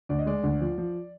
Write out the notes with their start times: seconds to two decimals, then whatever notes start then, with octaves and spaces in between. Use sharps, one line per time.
0.09 D2 D5
0.19 D#5
0.26 G#3 D5
0.43 D2
0.61 F3
0.78 F3